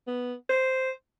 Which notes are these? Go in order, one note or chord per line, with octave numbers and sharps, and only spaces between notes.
B3
C5